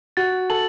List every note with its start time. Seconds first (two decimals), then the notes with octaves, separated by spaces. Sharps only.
0.17 F#4 A6
0.50 A4 F#7